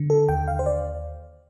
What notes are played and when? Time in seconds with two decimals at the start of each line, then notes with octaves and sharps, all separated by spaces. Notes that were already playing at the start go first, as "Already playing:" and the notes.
Already playing: D3
0.10 A4
0.29 D#2 G5
0.48 F5
0.59 C5
0.66 D5